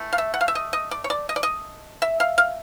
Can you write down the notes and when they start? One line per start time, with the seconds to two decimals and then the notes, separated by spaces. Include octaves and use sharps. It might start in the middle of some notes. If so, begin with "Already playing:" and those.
Already playing: E3 A3
0.13 F5
0.18 E5
0.34 F#5
0.41 F5
0.48 E5
0.55 D#5
0.73 D#5
0.91 D5
1.04 C#5
1.10 D5
1.29 D#5
1.36 D5
1.43 D#5
2.02 E5
2.20 F5
2.38 F5